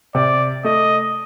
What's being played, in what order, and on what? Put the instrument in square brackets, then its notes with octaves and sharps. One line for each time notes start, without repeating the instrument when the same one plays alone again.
[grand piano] C3 [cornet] D5
[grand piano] A3 [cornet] D#5